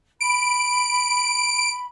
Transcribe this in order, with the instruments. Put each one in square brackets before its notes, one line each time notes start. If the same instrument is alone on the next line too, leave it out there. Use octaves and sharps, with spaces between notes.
[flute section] B5 [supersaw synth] D7